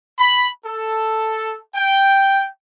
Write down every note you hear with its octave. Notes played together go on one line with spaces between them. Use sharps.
B5
A4
G5